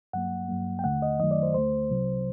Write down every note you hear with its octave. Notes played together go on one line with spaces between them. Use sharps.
G2 F#3 A#3 F#5
G2 F#3 A#3
G5
D#2 D3 A3 F#5
D#5
F#2 D#3 F#3 A3 D#5
D5
C5
D2 D3 A3 C5
C2 C3 F#3